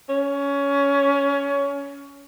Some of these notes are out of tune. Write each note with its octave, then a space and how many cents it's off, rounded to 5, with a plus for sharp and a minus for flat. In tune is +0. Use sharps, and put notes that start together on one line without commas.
C#4 +20